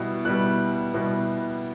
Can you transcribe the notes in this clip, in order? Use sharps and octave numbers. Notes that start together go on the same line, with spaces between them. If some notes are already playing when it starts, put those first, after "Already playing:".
Already playing: B2 G3 B3 E4
B2 G3 B3 E4 F#6
B2 G3 B3 E4